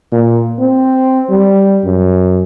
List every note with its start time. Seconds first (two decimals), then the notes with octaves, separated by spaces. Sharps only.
0.12 A#2
0.59 C4
1.30 G3
1.84 F#2